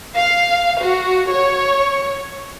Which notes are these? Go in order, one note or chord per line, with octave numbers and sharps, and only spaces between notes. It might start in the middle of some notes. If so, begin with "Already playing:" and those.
F5
F#4
C#5